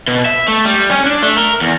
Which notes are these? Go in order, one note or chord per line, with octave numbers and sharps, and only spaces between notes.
B2
E5
A3
G3
C#4
D4
A3
A#4
E2